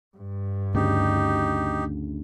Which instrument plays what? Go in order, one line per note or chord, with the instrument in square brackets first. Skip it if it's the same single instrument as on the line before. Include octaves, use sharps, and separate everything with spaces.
[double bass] G2
[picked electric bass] D2 C#3 [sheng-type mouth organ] D#4 G4